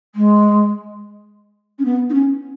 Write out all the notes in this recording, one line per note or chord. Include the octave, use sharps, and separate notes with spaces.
G#3
C#4
B3
D#4
C#4